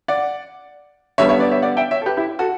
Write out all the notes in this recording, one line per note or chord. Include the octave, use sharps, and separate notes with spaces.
D5 F#5
D3 G3 B3 C#5 E5
C#5 E5
B4 D5
C#5 E5
D5 F#5
E5 G5
C#5 E5
A4
G4 B4
E4 G4
F#4 A4